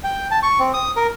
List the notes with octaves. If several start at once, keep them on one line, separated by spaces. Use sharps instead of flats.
G5
A5
C#6
C4
D#6
A#4